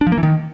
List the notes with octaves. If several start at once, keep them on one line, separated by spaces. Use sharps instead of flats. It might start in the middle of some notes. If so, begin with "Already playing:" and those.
D4
F3
A#3
E3
D#3